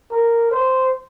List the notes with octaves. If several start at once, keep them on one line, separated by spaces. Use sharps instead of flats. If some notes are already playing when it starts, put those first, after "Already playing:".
A#4
C5